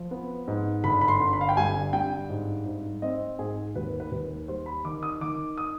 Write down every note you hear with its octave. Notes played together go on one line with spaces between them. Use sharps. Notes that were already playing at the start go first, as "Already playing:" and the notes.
Already playing: F3
B3
G#2
G1 B5
B5
C6
D3
B5
F5
G5
G2 G#5
G2 G5
G#2
G#2
C4 D#5
G#2 G#4
D#2 B4
B4
D#2
G3 C5
B5
D#3 D6
D#6
D#3 D6
D#6